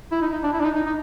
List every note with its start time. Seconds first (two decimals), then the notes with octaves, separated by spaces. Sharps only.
0.12 E4
0.22 D#4
0.32 D#4
0.43 D4
0.53 E4
0.60 D4
0.64 D#4
0.76 D#4
0.86 D#4